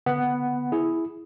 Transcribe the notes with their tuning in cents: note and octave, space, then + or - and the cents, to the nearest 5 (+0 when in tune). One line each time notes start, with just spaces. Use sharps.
D3 -25 B3 +0 F#5 +10
E4 +0 G#4 +0